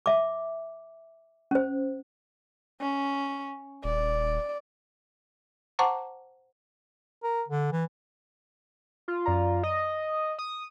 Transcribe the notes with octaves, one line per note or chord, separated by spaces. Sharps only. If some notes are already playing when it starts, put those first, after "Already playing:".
E5 D6
C#4 C5
C#4
D#1 D5
C5 F#5 A5 A#5 C#6 D6
A#4
D3
E3
F4
F#2 D5 A#5
D#5 D#6
D#6